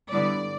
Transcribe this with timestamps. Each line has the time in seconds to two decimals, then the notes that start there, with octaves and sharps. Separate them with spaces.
0.12 D3 G3 B3 E4 D5